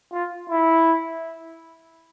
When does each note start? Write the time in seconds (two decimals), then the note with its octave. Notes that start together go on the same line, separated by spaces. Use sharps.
0.12 F4
0.50 E4